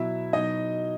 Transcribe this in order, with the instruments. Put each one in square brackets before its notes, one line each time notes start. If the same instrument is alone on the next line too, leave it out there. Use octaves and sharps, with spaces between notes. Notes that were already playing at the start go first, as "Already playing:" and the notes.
Already playing: [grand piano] B2 F#3 E4 E5
B2 F#3 D#4 D#5